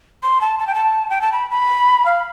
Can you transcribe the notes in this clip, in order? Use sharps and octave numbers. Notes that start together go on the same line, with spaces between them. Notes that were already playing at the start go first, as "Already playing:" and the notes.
C6
A5
A5
G5
A5
G5
A5
B5
B5
F5